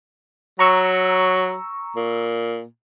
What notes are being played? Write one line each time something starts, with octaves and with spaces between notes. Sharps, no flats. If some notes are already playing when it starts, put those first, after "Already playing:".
F#3 A#5 C#6 E6
A#2